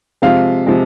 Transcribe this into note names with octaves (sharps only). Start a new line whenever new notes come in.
C3 F3 G#3 F4 F5
C3 F3 G#3